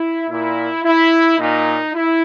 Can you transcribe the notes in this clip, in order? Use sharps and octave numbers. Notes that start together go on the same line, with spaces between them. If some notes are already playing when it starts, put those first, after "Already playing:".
Already playing: E4
A#2 E4
E4
A#2 D#4
E4